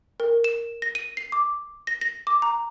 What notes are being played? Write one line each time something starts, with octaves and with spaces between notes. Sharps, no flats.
A#4
E7
A#6
D#7
C7
D6
A#6
A#6
D6
A#5